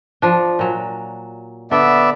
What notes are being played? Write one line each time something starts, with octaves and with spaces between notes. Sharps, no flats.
F3 D4
A#2 F#3
D3 B3 D5 E5